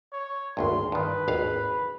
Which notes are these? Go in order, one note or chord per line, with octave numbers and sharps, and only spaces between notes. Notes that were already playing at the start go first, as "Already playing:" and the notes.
C#5
G#1 D2 G2 C6
G2 D#3 B4
G#1 D#2 F5